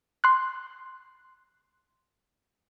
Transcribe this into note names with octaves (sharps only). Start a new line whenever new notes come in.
C6 F#6